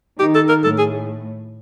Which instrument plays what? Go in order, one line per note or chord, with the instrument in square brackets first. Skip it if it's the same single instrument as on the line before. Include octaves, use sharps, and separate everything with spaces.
[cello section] D#3 D#4 [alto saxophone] G4
[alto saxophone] A4
A#4
[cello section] A2 A3 [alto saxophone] A4
[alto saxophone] G#4